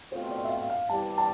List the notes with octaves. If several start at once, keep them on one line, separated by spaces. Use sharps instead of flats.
B2 A3 C4 F4 C5
D5
E5
F5
F5
E2 C3 E3 G3 A5
A5